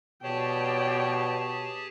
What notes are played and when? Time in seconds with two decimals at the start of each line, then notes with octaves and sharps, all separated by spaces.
0.23 B2 G4 G#4 C#5 D5 G5 A5